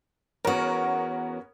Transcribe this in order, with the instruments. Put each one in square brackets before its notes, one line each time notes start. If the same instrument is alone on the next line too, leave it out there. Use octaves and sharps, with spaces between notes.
[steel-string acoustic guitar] E2 F#4 [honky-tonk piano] B3 C#4 A#4